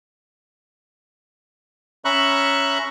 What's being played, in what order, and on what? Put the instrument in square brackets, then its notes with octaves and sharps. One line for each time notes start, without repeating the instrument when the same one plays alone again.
[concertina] C#4 E5 A#5 B5 C#6 F#6